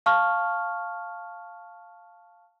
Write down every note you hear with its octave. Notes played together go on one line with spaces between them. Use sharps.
F5 A5 C#6 F6